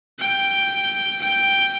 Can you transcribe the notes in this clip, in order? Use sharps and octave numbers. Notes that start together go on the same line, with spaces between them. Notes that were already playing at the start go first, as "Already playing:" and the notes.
G5
G5